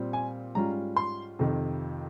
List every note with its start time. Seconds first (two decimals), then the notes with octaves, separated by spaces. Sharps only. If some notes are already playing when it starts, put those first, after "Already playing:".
Already playing: A#2 G3 C4
0.13 G#5
0.55 G#2 G3 C#4 F4 A#5
0.96 C6
1.39 F2 C3 D#3